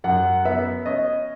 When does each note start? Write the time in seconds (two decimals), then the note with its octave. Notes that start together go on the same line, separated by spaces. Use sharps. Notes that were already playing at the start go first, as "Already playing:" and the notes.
0.04 F#2 F#5
0.45 B3 E5
0.86 C#4 D#5